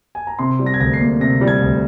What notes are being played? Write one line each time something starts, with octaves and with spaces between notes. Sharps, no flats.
G#5
A#5
C3 C6
G3
A#6
G#6
D2 A#6
C7
A#3
C3 A#6
G3
G#6
D2